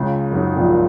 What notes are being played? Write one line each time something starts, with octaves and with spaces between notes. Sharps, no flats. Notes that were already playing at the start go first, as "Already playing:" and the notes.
Already playing: C#2 C#3
F#2
G#2
A#1 A#2